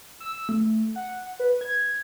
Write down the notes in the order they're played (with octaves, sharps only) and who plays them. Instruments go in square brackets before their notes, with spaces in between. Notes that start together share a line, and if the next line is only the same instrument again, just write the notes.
[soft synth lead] E6
A3
F#5
B4
G#6